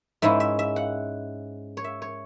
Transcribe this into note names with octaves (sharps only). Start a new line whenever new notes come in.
G#2 G#3 C#4 E4 E5
E5
E5
F#5
C#5
E5
C#5